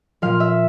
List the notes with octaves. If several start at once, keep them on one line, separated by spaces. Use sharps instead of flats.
A#2 F3 F5
E5